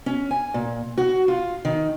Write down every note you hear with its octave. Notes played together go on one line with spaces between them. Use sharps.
C#4
G#5
A#2
F#4
F4
D#3